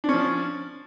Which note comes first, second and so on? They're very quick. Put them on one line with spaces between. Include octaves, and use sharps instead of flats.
D4 C#4 F3